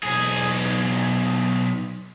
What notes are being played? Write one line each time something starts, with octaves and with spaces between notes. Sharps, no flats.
B1 G#4